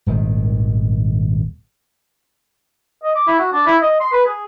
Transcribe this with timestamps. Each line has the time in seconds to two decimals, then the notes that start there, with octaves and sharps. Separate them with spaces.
0.06 D#1 G#1 D#3
3.03 D#5
3.15 D6
3.27 E4
3.38 F#4
3.52 D4
3.66 E4
3.82 D#5
4.00 C6
4.12 B4
4.25 G#4